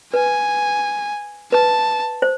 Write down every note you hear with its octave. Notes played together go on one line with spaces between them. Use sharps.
B4 G#5
B4 A5
C5